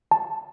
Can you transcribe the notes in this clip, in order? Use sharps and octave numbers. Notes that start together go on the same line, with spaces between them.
A5